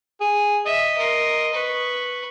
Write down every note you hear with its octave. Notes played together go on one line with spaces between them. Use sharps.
G#4
D#5 E5
A#4 C6
B4 C#6